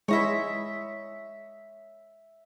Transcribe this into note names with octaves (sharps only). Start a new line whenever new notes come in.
G#3 E4 C#5 D#5 E5